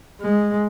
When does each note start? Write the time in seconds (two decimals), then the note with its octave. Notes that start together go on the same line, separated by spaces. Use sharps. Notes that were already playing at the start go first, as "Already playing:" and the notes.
0.21 G#3